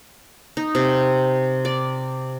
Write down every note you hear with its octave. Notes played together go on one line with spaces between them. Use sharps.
D#4
C3
D5